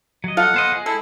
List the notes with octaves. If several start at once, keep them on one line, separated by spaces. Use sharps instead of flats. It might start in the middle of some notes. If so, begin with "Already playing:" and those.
F#3 D#5
F4 A4 F5 F#5
B3 C5 D#5
G#3 G#4
E4 A4